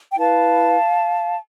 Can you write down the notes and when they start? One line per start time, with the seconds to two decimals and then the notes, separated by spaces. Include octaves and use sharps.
0.12 G5
0.17 E4 B4 F5 A5